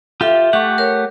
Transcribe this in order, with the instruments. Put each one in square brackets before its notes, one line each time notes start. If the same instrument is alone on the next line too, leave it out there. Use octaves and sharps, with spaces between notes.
[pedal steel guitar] F4 G4 [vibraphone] A4 E5
[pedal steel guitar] A3 G4 F#5 [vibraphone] C#6
[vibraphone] A#4 C#5